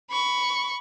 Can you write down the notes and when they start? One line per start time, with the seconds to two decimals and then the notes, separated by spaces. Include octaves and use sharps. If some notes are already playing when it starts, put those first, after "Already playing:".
0.10 B5 C#6